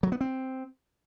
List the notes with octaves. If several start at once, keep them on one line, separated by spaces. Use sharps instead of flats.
F#3
B3
C4